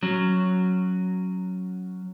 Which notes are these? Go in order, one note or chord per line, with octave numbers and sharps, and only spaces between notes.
F#3 C#4